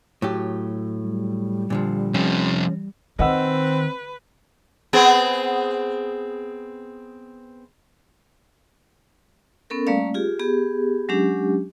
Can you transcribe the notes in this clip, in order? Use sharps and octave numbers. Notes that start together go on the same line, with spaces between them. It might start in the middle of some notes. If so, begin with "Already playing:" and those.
A2 F#3 F#4 G4
G3
A#2 D3 F3
C3 F3 C#4
D#3 C4 B4 D#5 F#5 E6
B3 C4 G#4
B3 C#4 A4 A#4
G3 A3 A#3 C#4 D5 F5
F4 G4 G#4
B3 G4 G#4
F#3 G#3 C#4 D4 G4